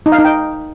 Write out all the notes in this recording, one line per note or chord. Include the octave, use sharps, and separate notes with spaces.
D#4
F5
D#4
G5